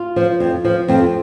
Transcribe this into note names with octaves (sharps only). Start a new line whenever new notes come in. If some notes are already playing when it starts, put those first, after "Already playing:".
Already playing: F4
F3
F2
F3
F2 C4